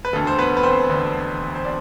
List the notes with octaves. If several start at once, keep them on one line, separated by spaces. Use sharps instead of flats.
B4
E1 D2 D3 A4
C5
B3 B4
B4
C4 C5
E1 D2 D3
C5
D4 D5